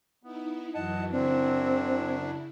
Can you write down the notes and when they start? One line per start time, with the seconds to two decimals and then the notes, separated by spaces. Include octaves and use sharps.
0.23 B3 D#4 E4
0.74 F#2 E3 F#3 D#5 F#5 A5
1.11 F#2 C#3 C4 D4 E4